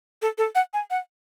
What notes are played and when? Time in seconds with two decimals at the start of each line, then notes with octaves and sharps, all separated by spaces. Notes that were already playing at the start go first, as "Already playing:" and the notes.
0.22 A4
0.38 A4
0.55 F#5
0.74 G#5
0.90 F#5